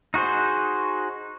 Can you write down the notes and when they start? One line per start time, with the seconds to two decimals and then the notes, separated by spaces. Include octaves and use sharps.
0.14 D#4 F#4 G#4 C5